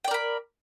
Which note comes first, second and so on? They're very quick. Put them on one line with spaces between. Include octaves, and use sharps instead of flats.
G5 D5 A#4 B5